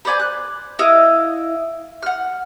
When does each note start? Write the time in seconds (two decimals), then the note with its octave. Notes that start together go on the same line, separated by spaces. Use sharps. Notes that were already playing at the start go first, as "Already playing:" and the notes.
0.05 B4 C5 D5 G#5
0.19 F#6
0.79 E4 D#5 F5
2.03 F#5 F6